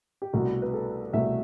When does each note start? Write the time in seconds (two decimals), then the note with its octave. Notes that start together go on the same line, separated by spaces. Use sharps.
0.22 G4
0.33 C2 B2 A3 F#4
0.62 B4
0.73 A4
1.13 C2 B2 A3 E5